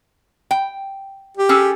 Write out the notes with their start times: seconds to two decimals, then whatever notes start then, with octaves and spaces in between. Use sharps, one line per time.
0.51 G5
1.37 G4
1.49 C#4 G#4 A4